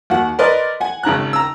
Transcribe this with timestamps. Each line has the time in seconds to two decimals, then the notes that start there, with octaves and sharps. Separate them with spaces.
0.10 D#2 F#4 F#5
0.39 A#4 B4 D5 D#5 C6
0.80 F#5 G#5
1.03 G#1 C#3 A#5 F#6
1.33 A#5 E6